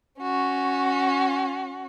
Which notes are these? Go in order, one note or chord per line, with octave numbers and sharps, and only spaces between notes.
C#4 F#4